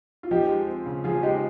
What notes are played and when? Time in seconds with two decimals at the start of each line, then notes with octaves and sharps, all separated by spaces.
0.23 F4
0.31 F3 D#4 G4
0.49 G#3
0.67 C4
0.86 C#3
1.04 F3 F4 G#4
1.23 G#3 D#4 G4